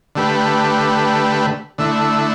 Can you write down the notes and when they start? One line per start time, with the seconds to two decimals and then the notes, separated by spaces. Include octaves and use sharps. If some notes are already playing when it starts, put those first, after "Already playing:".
0.16 D3 A3 G4 B4
1.78 D3 A3 E4